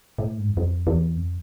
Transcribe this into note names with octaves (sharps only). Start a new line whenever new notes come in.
A2
G#2
E2
F2
E2
F2